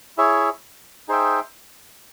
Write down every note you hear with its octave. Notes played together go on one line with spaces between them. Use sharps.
E4 G#4 C#5 E5
D#4 G#4 C5 E5 G5